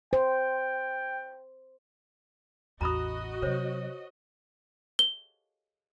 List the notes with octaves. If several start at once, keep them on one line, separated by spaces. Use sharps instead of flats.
C5 G5
A1 E2 F#4 D#5 A#5 B5 D#6
C3 F#3 C5 C#5
G7